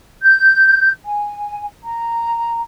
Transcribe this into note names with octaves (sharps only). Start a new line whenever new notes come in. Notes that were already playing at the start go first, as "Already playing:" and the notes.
G6
G#5
A#5